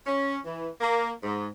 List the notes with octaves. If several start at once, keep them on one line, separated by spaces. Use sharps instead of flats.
C#4
E3
A#3
G#2